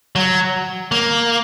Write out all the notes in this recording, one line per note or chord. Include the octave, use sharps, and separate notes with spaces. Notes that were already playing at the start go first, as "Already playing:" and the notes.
F#3
A#3